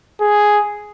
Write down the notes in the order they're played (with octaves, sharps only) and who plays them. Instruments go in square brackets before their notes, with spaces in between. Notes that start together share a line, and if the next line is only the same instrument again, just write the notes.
[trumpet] G#4